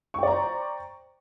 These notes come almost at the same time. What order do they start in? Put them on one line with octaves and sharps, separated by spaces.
C#6 G5 D5 A#5 C5